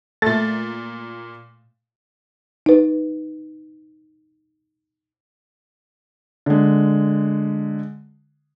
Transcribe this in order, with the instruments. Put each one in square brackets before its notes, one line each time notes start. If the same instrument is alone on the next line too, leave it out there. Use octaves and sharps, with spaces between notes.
[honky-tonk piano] A#2 A6 [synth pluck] A3
[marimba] D#4 B4
[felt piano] D3 G#3